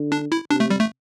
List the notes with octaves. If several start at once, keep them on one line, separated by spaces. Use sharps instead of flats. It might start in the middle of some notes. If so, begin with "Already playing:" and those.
Already playing: D3
D4
E4
C3 D4
A3
G3
A3